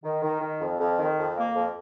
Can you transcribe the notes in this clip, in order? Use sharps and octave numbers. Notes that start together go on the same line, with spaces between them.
D#3
D#3
D#3
F2
F2
D#3
F2
A#3
F2